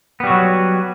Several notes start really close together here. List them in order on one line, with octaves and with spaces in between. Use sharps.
B3 G3 F#4 F#3